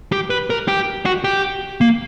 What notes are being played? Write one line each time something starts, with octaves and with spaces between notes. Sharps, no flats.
G4
B4
A#4
G4
F#4
G4
A#3